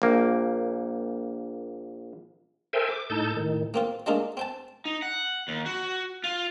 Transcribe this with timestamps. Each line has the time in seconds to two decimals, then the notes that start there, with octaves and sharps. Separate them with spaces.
0.02 A#1 A#3
2.73 A4 A#4 C5 E5 G5 G#5
2.89 D6
3.10 A2 D#4 A4 A5 G6
3.37 A2 D#3
3.74 A#3 C4 F4
4.06 F#3 G#3 A#3 D4 D#4 F4
4.37 C4 G5 A5
4.85 D#4
5.02 F#5
5.48 D#2
5.66 F#4
6.24 F4